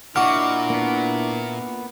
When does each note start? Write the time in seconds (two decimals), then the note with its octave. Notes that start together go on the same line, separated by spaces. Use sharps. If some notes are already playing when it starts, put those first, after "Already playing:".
0.16 A#2 D4 E4 F#4 D#5 D6 F6
0.70 A#3 B3